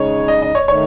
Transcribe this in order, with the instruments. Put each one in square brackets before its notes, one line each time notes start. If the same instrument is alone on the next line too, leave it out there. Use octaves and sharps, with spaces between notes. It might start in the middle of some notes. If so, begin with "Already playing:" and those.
Already playing: [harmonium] C#3 G#3 D#4 [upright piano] C#5
[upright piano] D#5
D#5
C#5
[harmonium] D#3 A3 D#4 [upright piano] C#5